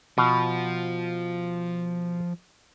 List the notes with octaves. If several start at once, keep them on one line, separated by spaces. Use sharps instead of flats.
B2 F3